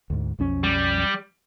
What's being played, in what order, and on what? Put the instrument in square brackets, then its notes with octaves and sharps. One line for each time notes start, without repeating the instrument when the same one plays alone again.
[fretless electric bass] D2 G#2
B1 F2 C#4
[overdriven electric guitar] G3